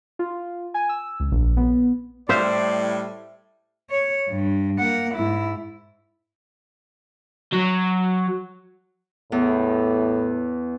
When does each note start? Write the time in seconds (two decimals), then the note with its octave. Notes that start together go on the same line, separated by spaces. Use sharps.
0.19 F4
0.74 G#5
0.89 E6
1.20 C#2
1.32 A#1
1.57 B3
2.29 A2 G3 C5 D5 E5 F5
3.90 C#5
4.28 G2
4.79 A#3 F#5
5.15 G#2 E4
7.52 F#3
9.32 E2 A2